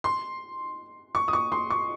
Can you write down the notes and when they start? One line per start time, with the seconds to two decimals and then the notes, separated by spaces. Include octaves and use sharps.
0.04 C6
1.15 C#6
1.28 D#6
1.33 C#6
1.52 C6
1.70 C#6